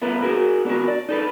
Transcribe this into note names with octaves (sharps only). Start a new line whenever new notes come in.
A3 B3 F4 A#4 B4
F#4 G#4 A#4
B3 D4 F#4 A#4
D5
D#4 A4 B4